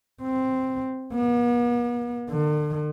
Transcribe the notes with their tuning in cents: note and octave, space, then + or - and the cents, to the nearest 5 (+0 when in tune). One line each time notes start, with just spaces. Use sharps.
C4 +0
B3 -45
D3 +40